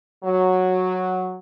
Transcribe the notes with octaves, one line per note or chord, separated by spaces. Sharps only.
F#3